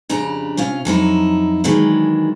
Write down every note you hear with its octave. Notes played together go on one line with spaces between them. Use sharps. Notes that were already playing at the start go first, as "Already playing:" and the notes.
F2 C#3 D4 G4 A#5
C3 C#4 F4 F5
F2 F#3 D#4 E4
D#3 E3 F#3 G#3 D4